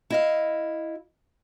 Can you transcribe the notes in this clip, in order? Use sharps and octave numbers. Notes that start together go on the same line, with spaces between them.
E4 D#5 F5